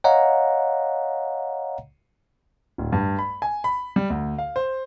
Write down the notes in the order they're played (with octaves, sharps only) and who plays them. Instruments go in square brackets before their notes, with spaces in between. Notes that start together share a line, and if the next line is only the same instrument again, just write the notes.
[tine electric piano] C#5 D#5 F5 F#5 A#5
[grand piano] D1
G2
B5
G#5
B5
G3
D2
F5
C5